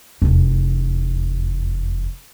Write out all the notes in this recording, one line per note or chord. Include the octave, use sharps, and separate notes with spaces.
F1 E2